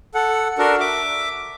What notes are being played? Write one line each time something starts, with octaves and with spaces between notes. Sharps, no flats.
A4 F#5
D4 F#4 A4 A#4
E5 D6